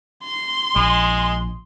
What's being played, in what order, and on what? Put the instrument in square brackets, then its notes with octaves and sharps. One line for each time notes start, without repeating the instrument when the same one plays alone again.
[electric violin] C6
[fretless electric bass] A#1 [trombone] G#3